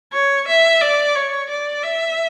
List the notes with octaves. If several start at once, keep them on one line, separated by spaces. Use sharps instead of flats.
C#5
E5
D5
C#5
D5
E5